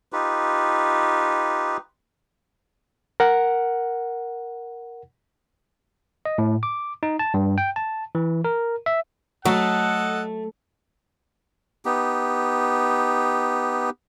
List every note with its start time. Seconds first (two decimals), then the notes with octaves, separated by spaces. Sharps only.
0.13 D#4 F4 G4 B4
3.20 A#4 F#5
6.25 D#5
6.38 A2
6.63 D6
7.03 D#4
7.19 A5
7.34 G2
7.58 G5
7.76 A5
8.15 E3
8.45 A#4
8.86 E5
9.45 F#3 A3 A4 D#5 F#5
11.85 B3 D#4 G4